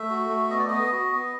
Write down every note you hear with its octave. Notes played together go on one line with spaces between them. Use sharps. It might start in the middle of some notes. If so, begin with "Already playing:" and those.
Already playing: A3 E5
F#4
A3
B3 D#5
D5
B3 D#5
F#4
B3